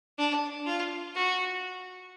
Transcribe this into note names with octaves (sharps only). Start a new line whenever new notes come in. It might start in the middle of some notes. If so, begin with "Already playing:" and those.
D4
F4
F#4